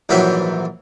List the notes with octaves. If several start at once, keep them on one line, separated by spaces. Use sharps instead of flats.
A#1 G#2 E3 F#3 E5 G5